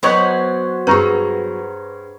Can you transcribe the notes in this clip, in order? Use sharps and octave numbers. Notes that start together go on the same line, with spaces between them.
F#3 B3 D#4 C5 C#5 F#5
G2 G#4 B4 A#5 C#6